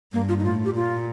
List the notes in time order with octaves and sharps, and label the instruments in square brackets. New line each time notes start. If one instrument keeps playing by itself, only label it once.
[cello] G2 [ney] A#3
[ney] F4
D#4
[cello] A2 [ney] F4
[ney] G4
[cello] A#2 [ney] F4